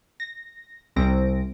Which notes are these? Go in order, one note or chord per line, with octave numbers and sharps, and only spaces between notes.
A#6
C2 C4 A#6 D7